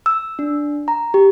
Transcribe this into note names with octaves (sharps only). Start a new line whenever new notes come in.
E6
D4
A#5
G4